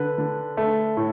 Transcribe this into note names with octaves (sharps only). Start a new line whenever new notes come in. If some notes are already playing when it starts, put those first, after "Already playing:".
Already playing: D3 B4
D3
A3
A2